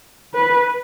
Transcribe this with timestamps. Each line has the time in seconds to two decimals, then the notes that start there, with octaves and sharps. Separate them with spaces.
0.34 B4